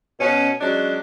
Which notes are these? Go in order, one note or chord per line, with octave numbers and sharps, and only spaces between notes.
B2 C#4
F#3 G#3 C#4 D4